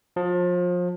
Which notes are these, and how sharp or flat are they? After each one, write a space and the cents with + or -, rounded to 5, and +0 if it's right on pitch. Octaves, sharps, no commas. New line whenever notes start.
F3 +30